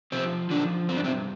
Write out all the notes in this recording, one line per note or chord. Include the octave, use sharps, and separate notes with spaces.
C3 F3 C4
D3 F3 D4
G2 C4
D4
C3 C4